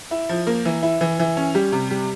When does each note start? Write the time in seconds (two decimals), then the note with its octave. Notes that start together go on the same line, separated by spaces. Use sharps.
0.11 E4
0.29 F3
0.47 A#3
0.65 E3
0.83 E4
1.01 E3
1.19 E3
1.37 C#4
1.55 G3
1.72 C3
1.91 G3